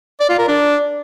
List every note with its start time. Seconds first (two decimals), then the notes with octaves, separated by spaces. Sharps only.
0.20 D5
0.29 F4
0.39 A#4
0.48 D4